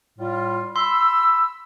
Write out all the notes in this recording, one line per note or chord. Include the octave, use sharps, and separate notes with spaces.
A2 G3 F4
B5 C6 E6